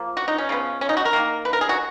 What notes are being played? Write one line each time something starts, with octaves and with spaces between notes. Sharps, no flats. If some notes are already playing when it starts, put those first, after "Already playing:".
Already playing: F3 A#3
F#4
D#4
C#4
C#3 F3 G#3 B3
C#4
D#4
F#4
A#4
D#3 A#3
B4
A#4
G#4
F#4